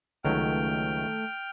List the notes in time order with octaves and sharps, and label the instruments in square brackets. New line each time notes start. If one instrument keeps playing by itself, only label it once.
[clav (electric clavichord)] C#2 F#3 [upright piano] D#3 [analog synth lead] A3 [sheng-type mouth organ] G5 F6